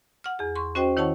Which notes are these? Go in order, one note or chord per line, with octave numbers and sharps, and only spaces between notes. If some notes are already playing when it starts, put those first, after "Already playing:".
F#5 F6
E2 G#4
C6 C#6
C#4 F#4 C5 D#5 G5
D#3 E4 C#5 F#5 A5 C#6